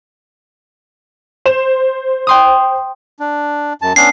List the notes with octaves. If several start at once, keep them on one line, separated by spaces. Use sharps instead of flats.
C5 E7
G5 C6 D#6
D4
F#2 A5
B3 C#4 D4 C7